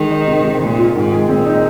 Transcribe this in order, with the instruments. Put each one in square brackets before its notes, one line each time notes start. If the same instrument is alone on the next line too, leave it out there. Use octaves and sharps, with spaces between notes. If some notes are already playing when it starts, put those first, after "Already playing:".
Already playing: [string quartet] D#3 [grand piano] G#3
[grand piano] D#4
C3
C3
[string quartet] A#2 [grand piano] G#3
[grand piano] F4
[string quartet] G#2 [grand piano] D#3
[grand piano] G#4
[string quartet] A#2 [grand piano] C4
[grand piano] D#4